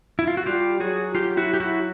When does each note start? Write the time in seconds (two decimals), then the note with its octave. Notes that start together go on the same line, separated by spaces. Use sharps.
0.19 E4
0.27 F4
0.37 F#4
0.46 G3 F4 G4
0.80 F#3 F#4 G#4
1.15 F4 G4
1.37 E4 F#4
1.54 G4
1.60 E4 F#4